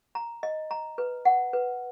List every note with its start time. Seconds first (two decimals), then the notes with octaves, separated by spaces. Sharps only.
0.15 A#5
0.43 D#5
0.71 A#5
0.98 B4
1.25 F#5
1.53 B4